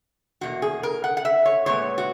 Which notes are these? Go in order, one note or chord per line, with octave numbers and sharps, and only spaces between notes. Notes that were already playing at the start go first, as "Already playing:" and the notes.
E2 B2 A#3 F#4
G#4
A#4
F#5
F#5
E5
C#5
A#2 G#3 B3 C#5
F#4